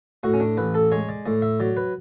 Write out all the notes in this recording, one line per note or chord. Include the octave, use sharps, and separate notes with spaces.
A2 F#4
C#4
D4
A1 B4
A4
G#3 C#5
D5
A2 D5
E5
F#3 D5
B4